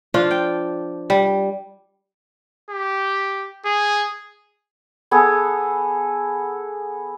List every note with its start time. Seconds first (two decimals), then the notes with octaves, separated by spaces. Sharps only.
0.14 F3 D4 F4
0.31 G5
1.10 G3
2.70 G4
3.66 G#4
5.11 B3 G#4 A4 D6